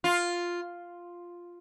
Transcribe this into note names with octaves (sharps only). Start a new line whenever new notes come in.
F4